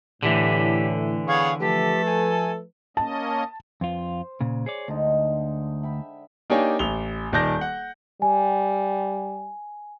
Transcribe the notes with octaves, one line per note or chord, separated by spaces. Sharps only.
A2 D3 E3 G4
B3 G#4 C#5 F5
F3 A3 G4 A4 B4
G#5
A#3 C#4 D#5 A5
F2 F4 C5
A#2 C#3
G#4 C#5 D5
D2 D3 G#3 D#4
E5 G5 B5
A#3 D4 D#4 G4 C#5 G#5
A1 F7 G7
D#1 D#3 D5 A5 G6 A#6
F#5
G3 G#5